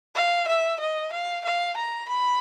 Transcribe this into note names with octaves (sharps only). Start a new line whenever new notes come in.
F5
E5
D#5
F5
F5
A#5
B5